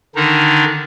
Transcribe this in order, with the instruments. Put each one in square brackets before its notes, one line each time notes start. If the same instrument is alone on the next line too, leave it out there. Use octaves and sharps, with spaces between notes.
[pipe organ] D3 D#3 D4 D#4